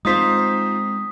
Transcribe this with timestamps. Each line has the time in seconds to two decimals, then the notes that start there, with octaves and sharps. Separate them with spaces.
0.05 G#3 C4 D#4 F4 C5 D#6 B6